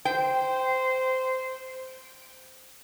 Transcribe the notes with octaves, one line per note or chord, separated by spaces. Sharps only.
C5 G5